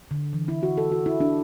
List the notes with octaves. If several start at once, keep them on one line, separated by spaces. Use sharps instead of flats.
D3
E3
E4
F#4
A4
F#4
E4
D4